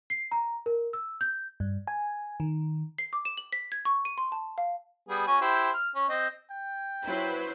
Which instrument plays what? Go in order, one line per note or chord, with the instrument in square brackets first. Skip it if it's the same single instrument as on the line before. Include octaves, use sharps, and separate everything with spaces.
[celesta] C7
A#5
A#4
E6
G6
[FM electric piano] G2
G#5
D#3
[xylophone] C7
D6
E7
F#7
B6
G#6
C#6
D#7
C6
A5
F5
[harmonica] G3 B3 G#4
C#4 F#4 G#5
E4 G4 C5
F6
C#4
C4 D#5
[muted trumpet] G5
[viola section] F#3 B4 C5 [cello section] E4